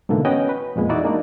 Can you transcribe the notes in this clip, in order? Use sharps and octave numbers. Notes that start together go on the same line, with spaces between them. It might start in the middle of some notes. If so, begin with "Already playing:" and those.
G#2 B2 D3 E3 A#3
B3 C#4 F#4 D#5 F#5 G5
B4
F2 A#2 G#3 B3
E3 D#4 E4 F#4 D5
G#3 A#3 D4 D#4 F#4